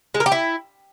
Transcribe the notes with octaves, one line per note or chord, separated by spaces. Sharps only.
G#3
A#4
G4
E4